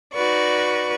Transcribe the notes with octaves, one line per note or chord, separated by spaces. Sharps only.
D#4 F#4 B4 D5 C#6